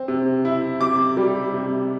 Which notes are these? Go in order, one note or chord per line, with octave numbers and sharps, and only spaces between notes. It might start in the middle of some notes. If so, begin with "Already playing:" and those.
Already playing: C4
C3
E4
C3 D6
G3
C3